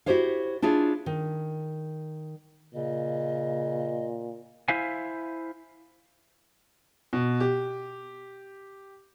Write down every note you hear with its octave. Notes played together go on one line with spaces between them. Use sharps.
E4 F#4 G4 C5 C#5 F5
D4 E4 F4 G#4 C#5
D#3
A#2 C#3 D#5
E4 C5 E5 F5 G#5
B2
G4